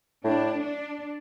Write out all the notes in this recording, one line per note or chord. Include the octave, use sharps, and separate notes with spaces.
A2 D4
D4